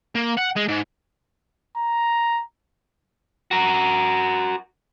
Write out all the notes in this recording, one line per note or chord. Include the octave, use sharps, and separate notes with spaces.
A#3
F#5
G#3
G#2
A#5
F#4 A#4